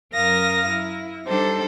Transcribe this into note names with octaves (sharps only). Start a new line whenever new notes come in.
F#2 A#4 F5 D#6 A#6
E4
G3 D4 D#4 A4 C5